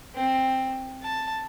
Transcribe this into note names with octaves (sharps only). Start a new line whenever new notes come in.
C4
A5